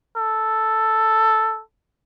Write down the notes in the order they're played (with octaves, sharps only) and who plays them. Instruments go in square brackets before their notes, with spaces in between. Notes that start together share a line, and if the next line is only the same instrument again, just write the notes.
[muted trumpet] A4